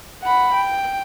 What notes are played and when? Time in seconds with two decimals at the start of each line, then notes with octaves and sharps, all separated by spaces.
0.22 F#5 B5
0.54 G5